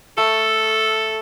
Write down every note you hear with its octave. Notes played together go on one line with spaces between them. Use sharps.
A3 A4